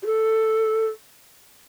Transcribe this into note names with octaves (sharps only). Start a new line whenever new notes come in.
G4
A4